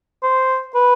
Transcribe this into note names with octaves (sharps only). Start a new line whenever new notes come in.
C5
B4